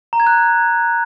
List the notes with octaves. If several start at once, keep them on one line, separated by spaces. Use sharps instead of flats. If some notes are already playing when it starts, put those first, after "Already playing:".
A#5
G#6
F#6